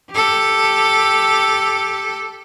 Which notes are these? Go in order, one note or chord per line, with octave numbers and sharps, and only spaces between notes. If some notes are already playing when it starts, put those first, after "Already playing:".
G4 A4